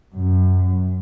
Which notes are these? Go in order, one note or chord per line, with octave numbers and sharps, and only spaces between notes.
F#2